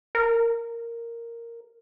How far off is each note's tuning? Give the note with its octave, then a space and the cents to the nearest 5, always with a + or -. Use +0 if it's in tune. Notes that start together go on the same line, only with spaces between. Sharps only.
A#4 -5